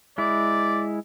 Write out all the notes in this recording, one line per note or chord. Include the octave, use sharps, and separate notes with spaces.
G#3 E4 D5